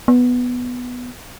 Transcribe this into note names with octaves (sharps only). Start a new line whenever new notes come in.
B3